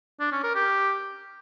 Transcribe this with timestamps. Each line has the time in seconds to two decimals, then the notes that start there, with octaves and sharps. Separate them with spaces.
0.20 D4
0.32 C#4
0.43 A#4
0.55 G4